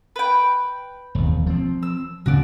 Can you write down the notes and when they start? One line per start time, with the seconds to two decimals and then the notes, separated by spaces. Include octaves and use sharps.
0.16 B4 G5
1.15 E1 D#2
1.46 F3 C4
1.83 E6
2.26 D2 C#3 B3 F#4 D5